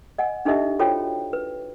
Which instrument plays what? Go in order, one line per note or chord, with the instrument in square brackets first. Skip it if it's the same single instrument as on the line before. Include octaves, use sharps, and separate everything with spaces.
[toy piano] D#5 F#5 G#5
D4 D#4 G4 A4 D#5 E5
F4 F#4 A4 C5 C#5 G5
B4